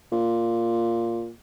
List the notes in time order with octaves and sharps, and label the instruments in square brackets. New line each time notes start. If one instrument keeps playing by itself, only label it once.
[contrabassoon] A#2